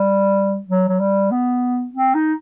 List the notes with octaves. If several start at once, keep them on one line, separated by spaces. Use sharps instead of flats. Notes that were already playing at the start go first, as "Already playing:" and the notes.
Already playing: G3
F#3
F#3
G3
B3
C4
D#4